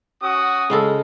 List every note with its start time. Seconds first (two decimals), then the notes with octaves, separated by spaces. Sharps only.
0.21 C#4 F#4 D#6
0.70 C#3 G#3 A4